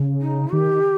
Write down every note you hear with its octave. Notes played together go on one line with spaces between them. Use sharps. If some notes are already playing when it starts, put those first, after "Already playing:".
Already playing: C#3
D#4
D#3 G4